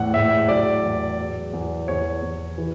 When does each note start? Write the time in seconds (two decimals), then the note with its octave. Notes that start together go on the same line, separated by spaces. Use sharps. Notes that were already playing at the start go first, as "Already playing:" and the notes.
Already playing: E2 A2 F#5
0.14 A2 E5
0.48 F#3 D5
0.83 E2
1.18 F#3
1.53 E2
1.88 E2 C#5
2.22 E2
2.58 E3